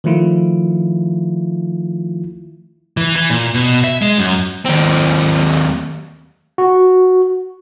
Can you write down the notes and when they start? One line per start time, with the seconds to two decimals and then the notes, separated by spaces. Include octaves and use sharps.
0.04 D#3 F3 A3 E4 F4
2.97 E3
3.16 E3
3.30 A#2
3.54 B2
3.84 E5
4.02 G#3
4.19 F#2
4.66 D#2 C4
6.58 F#4